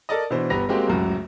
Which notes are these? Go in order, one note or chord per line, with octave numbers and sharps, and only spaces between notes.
A4 A#4 D5 D#5
B2 E3 D4 C5
G1 B3 G4 B4 A#6 F7
G#3 A#3 C4 F#4 G4
D1 C#2 F#2 F#4